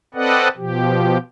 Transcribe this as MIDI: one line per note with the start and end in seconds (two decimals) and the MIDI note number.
0.15 0.48 60
0.15 0.48 69
0.15 0.48 71
0.15 0.48 74
0.15 0.48 75
0.15 0.48 78
0.57 1.17 47
0.57 1.17 53
0.57 1.17 67